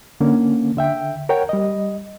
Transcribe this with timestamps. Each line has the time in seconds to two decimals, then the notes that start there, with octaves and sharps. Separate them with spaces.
0.21 D3 A#3 C#4
0.77 D3 E5 G5
1.29 A#4 C#5 F#5 G5
1.49 G3 D#5